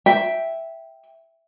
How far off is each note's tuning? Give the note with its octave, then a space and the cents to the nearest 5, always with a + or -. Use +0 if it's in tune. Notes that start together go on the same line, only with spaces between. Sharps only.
E5 +0 G5 +0